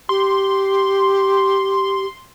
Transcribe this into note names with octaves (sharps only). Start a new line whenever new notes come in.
G4 C6